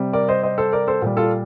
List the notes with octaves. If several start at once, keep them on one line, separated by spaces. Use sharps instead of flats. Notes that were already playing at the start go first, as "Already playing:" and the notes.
Already playing: C3 G3
A#4 D5
C5 D#5
C5 D#5
A4 C5
A#4 D5
A4 C5
A#2 G3
F4 A4